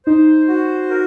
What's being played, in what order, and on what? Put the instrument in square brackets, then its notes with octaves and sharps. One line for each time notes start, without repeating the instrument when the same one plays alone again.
[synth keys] D#4 [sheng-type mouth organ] C5
[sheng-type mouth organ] F#4
A#4